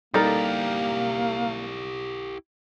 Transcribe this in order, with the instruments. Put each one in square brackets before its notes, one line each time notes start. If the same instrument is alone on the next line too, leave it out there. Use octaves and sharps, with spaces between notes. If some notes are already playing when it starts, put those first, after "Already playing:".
[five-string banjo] G3 A4 [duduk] A#3 [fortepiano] D#4 A#4 [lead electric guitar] E4 G4